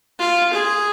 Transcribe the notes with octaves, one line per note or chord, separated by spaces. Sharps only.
F4
G#4